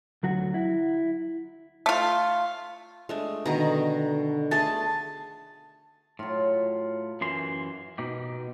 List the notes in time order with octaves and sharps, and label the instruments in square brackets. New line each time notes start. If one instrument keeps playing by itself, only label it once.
[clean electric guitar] D2 F#3 F#4
E4
[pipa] A3 F4
[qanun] G#3 A3 D4
[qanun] B2 D#3 D#5 [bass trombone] D3 [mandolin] A#5
[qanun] A3 G#4 C6 [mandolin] A5
[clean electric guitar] A2 [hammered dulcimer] F#3 F4
[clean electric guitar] F#2 E3 C6
B2 D#4 G4